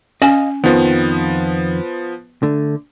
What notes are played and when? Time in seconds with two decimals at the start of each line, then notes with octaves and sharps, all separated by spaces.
0.22 C#4 D#5 F5 G#5
0.64 F2 D#3 F3 B3
2.43 D3 A3